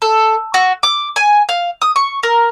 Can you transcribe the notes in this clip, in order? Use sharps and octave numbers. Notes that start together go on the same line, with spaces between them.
A4
F#4
D6
G#5
F5
D#6
C#6
A#4